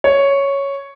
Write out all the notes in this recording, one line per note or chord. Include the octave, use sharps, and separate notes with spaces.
C#5